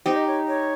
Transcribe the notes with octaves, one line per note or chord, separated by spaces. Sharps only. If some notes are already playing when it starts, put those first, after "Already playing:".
D#4 G4 C5
D#5
C#5
C#5